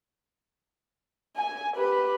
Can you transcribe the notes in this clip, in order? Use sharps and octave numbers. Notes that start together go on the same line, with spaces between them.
G#5
G4 B4